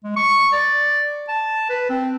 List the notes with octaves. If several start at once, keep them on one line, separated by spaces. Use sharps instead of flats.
G#3
C#6
D5
A5
B4
C4